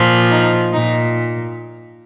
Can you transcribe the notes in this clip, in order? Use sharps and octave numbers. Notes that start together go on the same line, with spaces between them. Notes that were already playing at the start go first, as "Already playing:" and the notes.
Already playing: A#2 F3
D#4
A#2 D#4